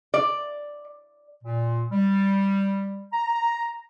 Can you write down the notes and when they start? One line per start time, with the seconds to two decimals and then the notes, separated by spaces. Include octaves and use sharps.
0.14 D5
1.44 A#2
1.92 G3
3.13 A#5